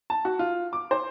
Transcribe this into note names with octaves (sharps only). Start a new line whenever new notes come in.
A5
F#4
F4
D6
C5